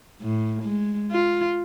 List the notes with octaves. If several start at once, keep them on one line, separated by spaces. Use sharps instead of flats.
A2
G#3
F4